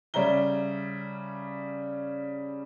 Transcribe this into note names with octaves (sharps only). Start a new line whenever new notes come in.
C#3 G3 C#5 E5 A#5 G7